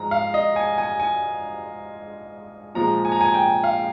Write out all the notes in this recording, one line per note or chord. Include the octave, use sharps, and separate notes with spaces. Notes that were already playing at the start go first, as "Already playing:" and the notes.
Already playing: G#2 F3 G#3 A#5
F5
D#5
G#5
G#5
G#5
A#2 F3 G#3 A#5
G#5
A#5
G#5
G5
F5